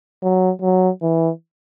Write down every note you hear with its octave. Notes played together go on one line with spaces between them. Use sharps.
F#3
F#3
E3